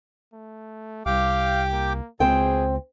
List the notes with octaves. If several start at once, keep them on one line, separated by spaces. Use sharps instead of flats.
A3
C2 G4 F5 G5 D6
A#3
C#2 B2 C4 G#4 C5 G5